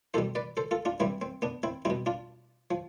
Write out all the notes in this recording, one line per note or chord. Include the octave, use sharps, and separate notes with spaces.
E2 B2 G3 A4 C5
B4 D5
A4 C5
F4 A4
D4 F4
G2 E3 G3 C4 E4
C4
B3 D4
C4 E4
B2 G3 C4 E4
D4 F4
F3